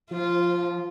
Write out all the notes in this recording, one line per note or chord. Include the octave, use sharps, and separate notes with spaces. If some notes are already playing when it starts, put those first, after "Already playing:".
F3 F4